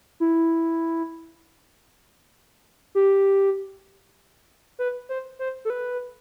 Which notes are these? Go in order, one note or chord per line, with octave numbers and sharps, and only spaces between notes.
E4
G4
B4
C5
C5
A4
B4